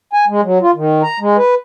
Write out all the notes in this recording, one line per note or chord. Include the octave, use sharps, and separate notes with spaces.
G#5
G#3
F#3
F4
D#3
A#5
G#3
B4